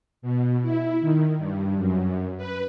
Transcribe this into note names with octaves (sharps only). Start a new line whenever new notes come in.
B2
E4
D#3
G2
F#2
B4